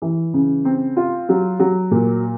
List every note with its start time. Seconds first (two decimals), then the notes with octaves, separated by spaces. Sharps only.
0.02 E3
0.33 C#3
0.65 C4
0.97 F4
1.29 F#3
1.59 F#3
1.91 A#2